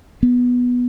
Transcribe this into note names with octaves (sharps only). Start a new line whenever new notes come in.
B3